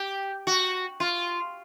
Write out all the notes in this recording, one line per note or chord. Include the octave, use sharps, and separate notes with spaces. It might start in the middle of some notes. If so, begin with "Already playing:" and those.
Already playing: G4
F#4
F4